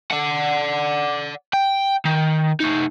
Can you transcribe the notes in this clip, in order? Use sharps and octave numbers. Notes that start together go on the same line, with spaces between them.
D5 F#5
G5
D#3
A3 D#4